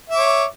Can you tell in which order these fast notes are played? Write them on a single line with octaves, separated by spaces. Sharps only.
E5 D6 C#5